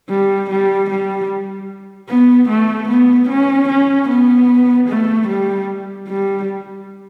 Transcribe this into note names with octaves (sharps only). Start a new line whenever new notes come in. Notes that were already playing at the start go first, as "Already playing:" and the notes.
G3
G3
G3
B3
A3
B3
C#4
C#4
B3
A3
G3
G3